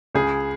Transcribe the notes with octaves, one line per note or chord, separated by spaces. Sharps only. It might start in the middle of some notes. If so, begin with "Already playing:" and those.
C#2 G#4